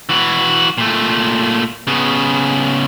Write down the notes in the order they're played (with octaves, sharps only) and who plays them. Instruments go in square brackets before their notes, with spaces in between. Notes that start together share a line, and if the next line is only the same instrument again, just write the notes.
[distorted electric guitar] E3 F#4
A#2 A3
C#3 B3